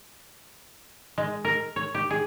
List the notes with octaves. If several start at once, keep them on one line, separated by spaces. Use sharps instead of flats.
G#3
A#4
C#5
G4
G#4